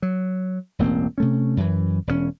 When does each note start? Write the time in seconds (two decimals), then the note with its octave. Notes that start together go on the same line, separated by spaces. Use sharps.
0.02 F#3
0.79 E1 A1 A#3 C4
1.18 C3 A3 C#4
1.57 F#2 E3
2.07 E1 G2 C#4